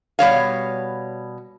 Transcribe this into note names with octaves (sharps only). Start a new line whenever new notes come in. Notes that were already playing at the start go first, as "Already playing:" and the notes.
B2 G3 C#5 F5